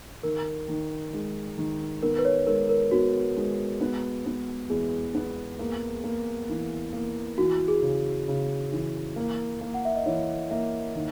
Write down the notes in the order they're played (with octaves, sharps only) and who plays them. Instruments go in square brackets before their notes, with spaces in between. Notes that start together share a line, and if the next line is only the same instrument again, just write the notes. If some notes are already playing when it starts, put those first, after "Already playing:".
[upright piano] D#3 [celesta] A#4
[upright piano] D#3
G#3
D#3
[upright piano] B3 [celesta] A#4
[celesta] B4
C#5
[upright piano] G#3 [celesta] A#4
[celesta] A#4
[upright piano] B3 [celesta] F#4
[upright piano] G#3
B3
B3
[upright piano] E2 [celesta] G#4
[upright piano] B3
A#3
A#3
E3
A#3
[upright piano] E3 [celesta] F#4
[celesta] G#4
[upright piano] C#3
C#3
E3
A#3
A#3
[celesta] F#5
E5
D#5
[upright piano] E3 [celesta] C#5
[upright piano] A#3 [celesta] E5
[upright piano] D#3